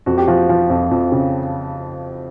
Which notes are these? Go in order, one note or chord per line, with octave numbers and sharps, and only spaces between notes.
F2 F#4
G4
F3 F#4
F3
F2
F2
C#3